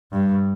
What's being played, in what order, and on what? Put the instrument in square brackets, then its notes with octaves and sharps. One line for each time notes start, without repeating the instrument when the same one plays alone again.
[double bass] G2